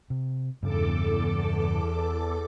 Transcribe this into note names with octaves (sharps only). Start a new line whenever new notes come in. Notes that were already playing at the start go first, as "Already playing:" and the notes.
C3
E2 G2 C#3 A4 D6